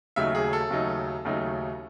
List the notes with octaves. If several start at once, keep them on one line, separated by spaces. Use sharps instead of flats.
D#2 C#3 F#3 A3 D#4 E5
G#4
A4
D#2 C#3 F#3 A3 D#4
D#2 C#3 F#3 A3 D#4